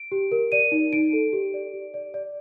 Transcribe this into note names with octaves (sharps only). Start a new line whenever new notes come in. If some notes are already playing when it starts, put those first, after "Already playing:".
Already playing: D7
G4
A#4
D5 D#7
D#4
D#4 D7
A4
G4
D5
G4
D5
D5